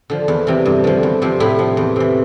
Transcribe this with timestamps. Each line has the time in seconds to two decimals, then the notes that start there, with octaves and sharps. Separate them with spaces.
0.10 D3 F3
0.28 E2
0.47 C3 E3
0.66 G2
0.84 D3 F3
1.03 E2
1.22 C3 F3
1.40 A2 E4
1.59 F3
1.77 E2
1.96 C3 E3